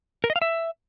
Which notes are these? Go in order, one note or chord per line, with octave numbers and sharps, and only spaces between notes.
A#4
D#5
F5
E5